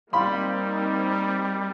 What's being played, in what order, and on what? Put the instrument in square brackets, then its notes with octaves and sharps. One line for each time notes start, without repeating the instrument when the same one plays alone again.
[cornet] G3 [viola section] A#3 C4 D#4 [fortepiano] F5 B5 C6